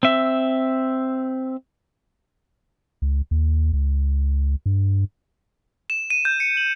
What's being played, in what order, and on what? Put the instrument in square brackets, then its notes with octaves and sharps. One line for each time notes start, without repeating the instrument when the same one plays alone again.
[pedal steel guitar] C4 E5
[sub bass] C#2
D#2
C#2
G2
[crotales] E7
D#7
G6
C#7
F#7